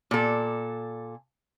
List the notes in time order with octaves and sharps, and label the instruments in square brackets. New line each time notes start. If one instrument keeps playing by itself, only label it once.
[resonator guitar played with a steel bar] A#2 A4